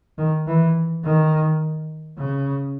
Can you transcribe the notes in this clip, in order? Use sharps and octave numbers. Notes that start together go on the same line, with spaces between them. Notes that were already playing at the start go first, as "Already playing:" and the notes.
D#3
E3
D#3
C#3